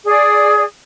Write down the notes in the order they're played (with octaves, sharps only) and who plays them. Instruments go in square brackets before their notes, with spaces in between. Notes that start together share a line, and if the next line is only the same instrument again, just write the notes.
[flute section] G#4 D5